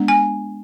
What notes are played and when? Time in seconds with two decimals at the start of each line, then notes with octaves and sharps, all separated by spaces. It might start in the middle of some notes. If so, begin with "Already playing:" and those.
Already playing: G#3 B3 D4
0.08 G#5